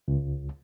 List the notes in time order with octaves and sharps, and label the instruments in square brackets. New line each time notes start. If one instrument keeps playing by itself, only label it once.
[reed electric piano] C#2